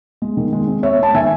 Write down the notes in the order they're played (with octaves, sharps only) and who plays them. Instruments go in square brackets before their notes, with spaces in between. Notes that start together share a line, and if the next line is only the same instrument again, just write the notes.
[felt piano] G#3
D#3
G#3
C4
C4 C#5 E5
G#3 A5
D#3 E5 G#5